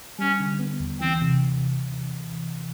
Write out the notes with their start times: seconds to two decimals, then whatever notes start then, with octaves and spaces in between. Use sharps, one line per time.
0.19 G3 C#4
0.40 D3
0.59 B3
0.80 D#2
1.00 E3 C4
1.22 C3